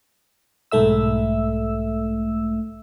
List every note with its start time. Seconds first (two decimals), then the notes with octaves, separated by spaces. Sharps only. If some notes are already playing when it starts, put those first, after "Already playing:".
0.71 B1 G#2 A3 E5 E6